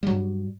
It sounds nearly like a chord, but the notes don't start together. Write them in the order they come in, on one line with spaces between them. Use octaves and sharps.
G3 F#3 G2